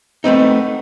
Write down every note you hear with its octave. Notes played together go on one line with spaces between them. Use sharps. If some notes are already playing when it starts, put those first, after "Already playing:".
A3 B3 C4 D#4